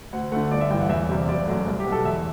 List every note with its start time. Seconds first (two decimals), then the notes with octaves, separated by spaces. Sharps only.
0.13 D2 F#5
0.32 D3 A3 F#5
0.51 G1 D5
0.61 E5
0.70 G2 E3 G5
0.80 F#5
0.89 E2 E5
1.09 C3 G3
1.28 F#1 D5
1.47 F#2 F#3 A3
1.67 C2
1.80 G4
1.86 B2 F#3
1.92 A4
2.05 E2 E5